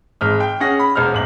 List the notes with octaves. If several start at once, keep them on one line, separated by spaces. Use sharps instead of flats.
G#1 G#3 F6
G5
C#4 G#4 F#5 A#6
B5
E1 C5 F6
D#1 G#1 F#7